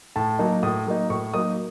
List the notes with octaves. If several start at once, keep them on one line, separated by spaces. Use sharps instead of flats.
A2 A5
F#3 A#3 D#4
A2 D#6
F#3 A#3 D#4
A2 C#6
F#3 A#3 D#4 D#6